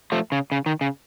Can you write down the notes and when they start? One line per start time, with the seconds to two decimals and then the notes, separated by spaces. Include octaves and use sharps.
0.12 F3 A3
0.32 C#3
0.52 C#3
0.66 D#3
0.81 C#3